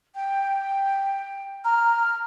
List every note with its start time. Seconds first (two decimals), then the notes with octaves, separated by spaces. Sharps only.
0.15 G5
1.65 A#5 F6